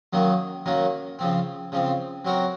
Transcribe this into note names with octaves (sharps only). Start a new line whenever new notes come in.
F#2 D#3 F#3 A#3 D#4
F#2 D#3 F#3 A#3 D#4
C#3 F3 C4
C#3 F3 C4
F#3 C4 F#4 A#4